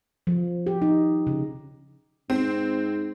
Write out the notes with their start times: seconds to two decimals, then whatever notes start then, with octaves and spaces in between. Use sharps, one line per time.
0.27 F3
0.66 G4
0.82 D#4
1.27 C#3
2.30 G#2 C4